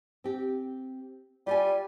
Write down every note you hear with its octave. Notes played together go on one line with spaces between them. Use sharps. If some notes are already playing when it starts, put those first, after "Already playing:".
C4 G4
G3 F4 G4 G#5